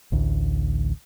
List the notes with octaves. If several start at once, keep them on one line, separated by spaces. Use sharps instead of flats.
A1 D2